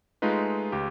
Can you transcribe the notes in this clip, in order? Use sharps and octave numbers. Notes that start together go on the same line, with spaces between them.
G#3 A3 D#4 F4 B4
C#2 G4